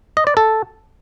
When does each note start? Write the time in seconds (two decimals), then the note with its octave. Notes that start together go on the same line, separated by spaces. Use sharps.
0.17 D#5
0.27 D5
0.37 A4